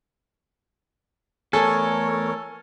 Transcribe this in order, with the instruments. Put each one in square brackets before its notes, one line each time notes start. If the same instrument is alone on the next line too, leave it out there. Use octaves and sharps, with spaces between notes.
[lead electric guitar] E2 A3 [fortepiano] A4 [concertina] A#4 C#5 [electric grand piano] G#5